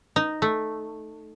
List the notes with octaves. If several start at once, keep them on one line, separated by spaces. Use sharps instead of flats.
D#4
A3